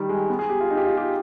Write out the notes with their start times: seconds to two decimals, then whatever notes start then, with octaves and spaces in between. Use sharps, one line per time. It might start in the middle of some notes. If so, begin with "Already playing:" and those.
Already playing: D#3 G3
0.09 G#3
0.30 B3
0.39 G#4
0.50 G4
0.60 F4
0.70 D#4
0.77 G4
0.84 F4
0.97 G4